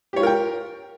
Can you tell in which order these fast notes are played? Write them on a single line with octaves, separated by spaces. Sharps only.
G4 C#5 F4 A#4 G5